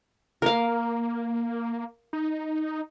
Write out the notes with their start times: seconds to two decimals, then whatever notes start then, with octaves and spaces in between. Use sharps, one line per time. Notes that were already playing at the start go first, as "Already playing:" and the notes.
0.42 A#3 A#4 F5
2.13 D#4